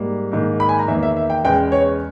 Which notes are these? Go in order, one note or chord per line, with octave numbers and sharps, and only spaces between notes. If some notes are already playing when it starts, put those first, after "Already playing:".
Already playing: G#2 G3 A#3
G#2 D#3 A#3
B5
G#5
A#5
E2 D#3 A#3 E5
E5
E5
G5
E2 C#3 G#3 B3 G5
C#5